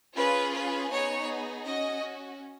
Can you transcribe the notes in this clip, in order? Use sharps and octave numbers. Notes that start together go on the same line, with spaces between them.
C#4 F4 G#4 B4
B4
B3 D#4 G#4 C#5
C#4 F#4 D#5